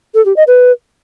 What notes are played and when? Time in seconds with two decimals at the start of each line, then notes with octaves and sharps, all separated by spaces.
0.14 A4
0.25 G4
0.36 D#5
0.47 B4